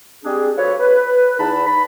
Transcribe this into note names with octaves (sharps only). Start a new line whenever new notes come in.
G3 G#3 C4 D4 G4 G#4
F3 F4 F#4 A4 B4 C#5
B4
E2 D#4 A5 B5
B5